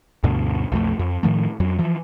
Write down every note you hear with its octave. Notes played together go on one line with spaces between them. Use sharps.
D2 G2 B2 D3
B1 F2 A3
F2
A2 D#3 F3 A3
F2 F#3
E3 F3